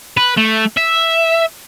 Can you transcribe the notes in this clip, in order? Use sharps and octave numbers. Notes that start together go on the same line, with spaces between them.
B4
A3
E5